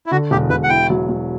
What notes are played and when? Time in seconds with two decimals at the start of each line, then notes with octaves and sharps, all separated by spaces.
0.06 E4
0.11 D3 F#4
0.31 E1 G4
0.50 E1 B4
0.63 F#5
0.69 E4 G5
0.90 F#3
1.09 F#3